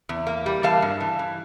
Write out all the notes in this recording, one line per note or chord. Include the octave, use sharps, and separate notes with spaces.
E2
A#3
G3
E3 F5 A5
G2
E3
E3